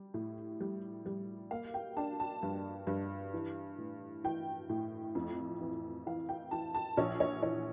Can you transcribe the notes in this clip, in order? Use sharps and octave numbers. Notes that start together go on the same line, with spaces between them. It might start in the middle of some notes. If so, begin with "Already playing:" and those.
Already playing: G3
A2
G3
G3
A#3 F5
G5
D4 A5
A5
G2
G2
E3
A2
E3 G5
A2
F2
E3
E3 F5
G5
E3 A5
A5
A#1 C#5
C#5
E3 C#5